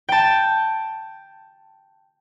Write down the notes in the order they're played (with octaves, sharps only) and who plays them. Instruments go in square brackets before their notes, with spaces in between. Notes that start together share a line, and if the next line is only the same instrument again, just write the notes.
[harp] G5 A5